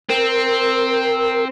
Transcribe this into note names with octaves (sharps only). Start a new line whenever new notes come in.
C4 A#4